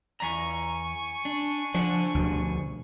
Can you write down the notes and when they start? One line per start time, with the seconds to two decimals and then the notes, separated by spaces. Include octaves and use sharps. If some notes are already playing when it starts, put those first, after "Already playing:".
0.20 E2 G#5 A#5 C#6
1.25 D4
1.74 F3 D4 D5 F#5
2.14 D2 B2 F3